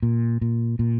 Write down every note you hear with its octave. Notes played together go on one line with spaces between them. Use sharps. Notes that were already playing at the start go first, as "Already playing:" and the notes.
A#2
A#2
A#2